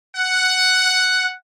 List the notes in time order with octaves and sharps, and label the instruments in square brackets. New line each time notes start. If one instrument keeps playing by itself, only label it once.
[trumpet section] F#5